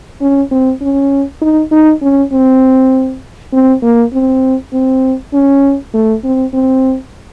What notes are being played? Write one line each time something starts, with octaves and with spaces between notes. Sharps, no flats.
C#4
C4
C#4
D#4
D#4
C#4
C4
C4
A#3
C4
C4
C#4
A3
C4
C4